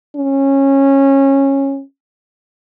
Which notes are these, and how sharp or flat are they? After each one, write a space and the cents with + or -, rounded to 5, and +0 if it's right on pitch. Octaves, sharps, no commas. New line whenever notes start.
C#4 -20